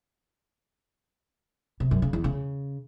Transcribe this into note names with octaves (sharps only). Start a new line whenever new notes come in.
C3
F#2
C#3
E2
C#3